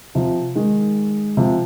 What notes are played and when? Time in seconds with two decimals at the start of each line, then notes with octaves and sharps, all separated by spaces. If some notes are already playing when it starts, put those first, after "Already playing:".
0.15 C3 F3
0.55 D#3 G#3
1.37 C3 F3